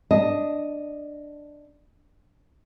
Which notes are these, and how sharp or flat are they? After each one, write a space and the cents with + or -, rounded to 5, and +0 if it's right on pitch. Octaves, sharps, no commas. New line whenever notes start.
D4 +10 D#5 +0 A5 +0